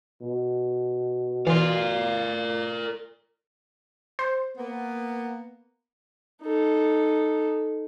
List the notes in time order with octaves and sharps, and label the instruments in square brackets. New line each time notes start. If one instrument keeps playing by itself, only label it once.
[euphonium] B2
[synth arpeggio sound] E3 [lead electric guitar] A#4 D5 [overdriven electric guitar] F5 C6
[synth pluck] C5
[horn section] A#3 B3
[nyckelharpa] D#4 A4